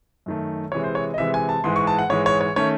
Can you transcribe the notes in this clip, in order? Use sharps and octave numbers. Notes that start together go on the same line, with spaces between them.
F#2 D#3 A3
C3 E3 G#3 C#5
C5
C#5
D#5
C3 E3 G#3 E5
G#5
A5
G#2 E3 G#3 C6
C#6
A5
F#5
G#2 E3 G#3 C#5
C#5
C#5
D#3 A3 C#4 C#5